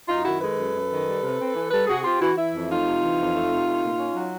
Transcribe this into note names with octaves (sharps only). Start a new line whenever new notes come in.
F#2 D#4 F4
D#3 E4 F#4
G#3 A4 B4
F#2
F#2
D#3
G3
C3
C4
E3
G3 A4 B4
C3 F#4 G#4
C4 F4 G4
E3 E4 F#4
E3 E4
F2
A3 D#4 F4
C3
E3
F2
A3
C3
A3
A#2
C#4
F#3